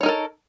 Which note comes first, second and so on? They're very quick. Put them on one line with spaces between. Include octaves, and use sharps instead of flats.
C#5 D#4 A#4 A4